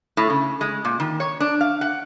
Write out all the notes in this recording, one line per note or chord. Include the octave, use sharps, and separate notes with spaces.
A2
C#3
G#3
A#2
D#3
C#5
D4
F5
F#5